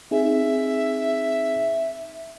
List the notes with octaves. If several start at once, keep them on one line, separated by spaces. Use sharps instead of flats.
C4 D#4 G#4 E5